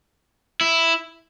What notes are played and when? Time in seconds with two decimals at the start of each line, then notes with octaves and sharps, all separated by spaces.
0.61 E4